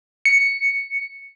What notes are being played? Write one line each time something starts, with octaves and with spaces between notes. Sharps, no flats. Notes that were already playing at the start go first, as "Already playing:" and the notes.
C#7